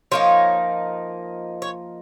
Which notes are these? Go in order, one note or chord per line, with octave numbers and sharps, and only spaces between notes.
F3 A#3 D#4 C#5
C#5